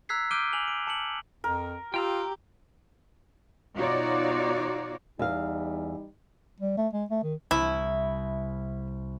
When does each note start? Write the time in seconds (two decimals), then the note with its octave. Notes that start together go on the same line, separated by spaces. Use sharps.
0.09 A#5 E6 F#6 G#6 B6 C7
0.31 D6 F6 G6 D7 D#7 G7
0.53 G#5 F7 F#7
0.68 D7
0.87 A5 C#7 F#7
1.44 F2 A#4
1.94 F4 G4 G5 A#5 E6
3.77 B2 D#4 F4 F#4 C#5 D5
5.19 E2 E3 G3 D#4 F5
6.60 G3
6.77 A3
6.93 G#3
7.10 A3
7.23 D#3
7.51 C2 E4